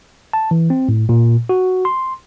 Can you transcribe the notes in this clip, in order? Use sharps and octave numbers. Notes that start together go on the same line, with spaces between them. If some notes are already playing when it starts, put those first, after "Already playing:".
A5
E3
C4
A2
A#2
F#4
C6